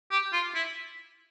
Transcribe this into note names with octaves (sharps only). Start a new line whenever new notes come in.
G4
F4
E4